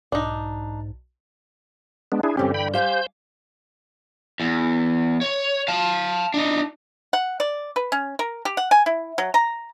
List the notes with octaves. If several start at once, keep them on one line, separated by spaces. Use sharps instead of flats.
B1 G#2 D4 D#4
G#3 B3 D4
D4 E4 G#4
G2 D3 E3 C4 C#4 G4
G5 B5
G4 C5 F5 G#5 G6
E2
C#5
F5 A5
D4 D#4
F#5
D5
B4
C#4
A#4
G4
F#5
G#5
E4
F#3
A#5